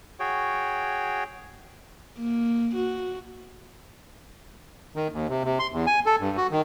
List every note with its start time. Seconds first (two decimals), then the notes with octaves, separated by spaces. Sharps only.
0.20 F#4 G#4 C#5 G5
2.18 A#3
2.75 F#4
4.96 D#3
5.12 D#2
5.29 C3
5.44 C3
5.59 C6
5.72 E2
5.87 G#5
6.06 A4
6.20 G2
6.37 F#4
6.51 D#3